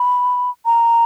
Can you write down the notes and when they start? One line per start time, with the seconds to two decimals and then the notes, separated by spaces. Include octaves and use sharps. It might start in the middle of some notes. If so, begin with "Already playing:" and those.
Already playing: B5
0.66 A#5